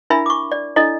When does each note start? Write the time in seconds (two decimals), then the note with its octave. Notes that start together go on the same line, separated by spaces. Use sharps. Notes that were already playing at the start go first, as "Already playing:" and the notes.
0.10 D4 E4 A#4 E5 G#5 B5
0.26 C#6 D6
0.52 D5
0.76 D4 E4 A4 D5 D#5